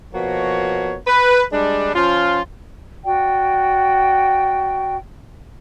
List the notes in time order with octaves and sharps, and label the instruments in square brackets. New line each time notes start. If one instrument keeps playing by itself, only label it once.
[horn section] B2 F3 A#3 F#4 C#5
B4
G3 G#3 D4
F3 C#4 F4
[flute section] F#4 D5 G5